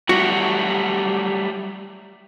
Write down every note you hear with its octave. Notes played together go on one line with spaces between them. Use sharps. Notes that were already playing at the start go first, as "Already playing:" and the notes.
F#3 G3 A3 F#4